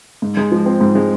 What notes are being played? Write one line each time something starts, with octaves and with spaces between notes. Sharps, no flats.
G#2
G#3
F3
C4
G#2
G#3